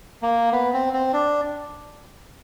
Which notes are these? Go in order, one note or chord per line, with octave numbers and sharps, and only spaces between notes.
A#3
B3
C4
C4
D4